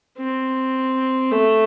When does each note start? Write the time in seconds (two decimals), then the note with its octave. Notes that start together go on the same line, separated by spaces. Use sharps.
0.18 C4
1.31 A3